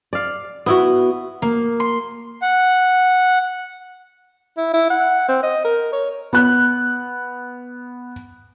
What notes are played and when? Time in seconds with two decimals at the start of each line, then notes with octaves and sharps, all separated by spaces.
0.13 D5 F5
0.66 B3 E4 F#4
1.42 A#3
1.80 C6
2.42 F#5
4.57 E4
4.74 E4
4.90 F#5
5.28 C4
5.43 D#5
5.65 A#4
5.92 C#5
6.33 B3 F#6